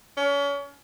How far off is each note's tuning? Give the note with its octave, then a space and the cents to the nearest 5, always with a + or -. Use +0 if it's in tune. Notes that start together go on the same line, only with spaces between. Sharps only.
C#4 +35